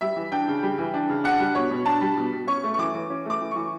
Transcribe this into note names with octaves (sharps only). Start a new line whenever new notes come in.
G3 E5
E3
D4 G5
C#3
G3
E3
D4
C#3
D4 F#5
G3
B2 C#5
B2
D4 A5
G3
B2
B2
C#4 C#6
A3
C#6
E3 D6
E3
C#4
A3 D6
E3
E3 C#6